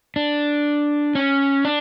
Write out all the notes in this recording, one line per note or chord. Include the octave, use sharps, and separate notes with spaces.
D4
C#4
D4